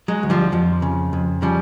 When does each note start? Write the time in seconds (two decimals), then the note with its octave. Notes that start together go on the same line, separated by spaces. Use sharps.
0.08 F#3 G#3
0.23 D2
0.30 F3 G3
0.52 F2 F3
0.82 C#3
1.13 F2
1.42 C#3 F3 G3